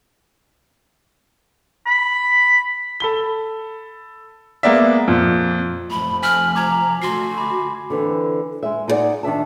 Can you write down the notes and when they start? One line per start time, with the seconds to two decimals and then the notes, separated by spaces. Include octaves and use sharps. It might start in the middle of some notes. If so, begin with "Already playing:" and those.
1.86 B5
3.00 A4 B5 G7
4.63 G#3 A#3 B3 D5 E5
5.08 F2 A#2
5.91 F1 F3 A3 B5
6.23 G#5 F6 B6 F#7
6.55 A#5 D6 G#6
7.02 D3 A3 F#4 C6 C7
7.38 B5 D6
7.90 D3 E3 C4
8.63 G#3 E5
8.88 D#4 E4 G#4 D5 F#5
9.23 D#3 D4 E5 A5